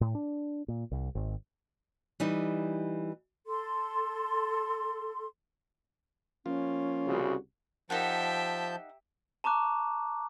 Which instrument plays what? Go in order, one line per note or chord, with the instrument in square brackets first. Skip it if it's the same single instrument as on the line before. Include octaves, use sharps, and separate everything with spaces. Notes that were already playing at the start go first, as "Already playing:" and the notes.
[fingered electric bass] A2
D4
A#2
C2
G#1
[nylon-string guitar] E3 G3 D#4
[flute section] A4 C6
[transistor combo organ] F3 A#3 F4 [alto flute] C#4
[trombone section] C2 C#3 F#4
[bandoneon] F3 A5 G6 [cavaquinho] D#4 A#4 F#5 [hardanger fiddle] G4 E5
[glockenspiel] A5 A#5 C#6 D6 F#6